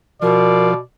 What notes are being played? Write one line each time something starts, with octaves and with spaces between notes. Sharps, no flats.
B2 F3 A#4 D5